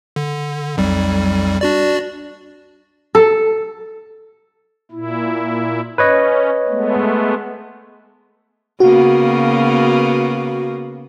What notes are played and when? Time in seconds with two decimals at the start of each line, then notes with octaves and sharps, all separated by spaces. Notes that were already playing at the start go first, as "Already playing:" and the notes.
0.16 D3
0.77 B1 F2 G3
1.61 D4 F#4 D5
3.15 A4
4.91 A#2 E4
5.98 C#4 B4 C#5 D#5
6.68 G#3 A3 B3
8.80 C#3 A#3 B3 F#4